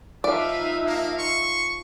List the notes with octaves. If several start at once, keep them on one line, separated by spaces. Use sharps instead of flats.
F3 D#4 B4 D5 E5 F5
A#3 F5
C6 C#6